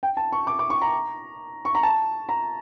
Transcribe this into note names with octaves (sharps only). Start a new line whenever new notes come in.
G5
A5
C#6
D6
D6
C#6
A#5
C#6
A#5
A5
A#5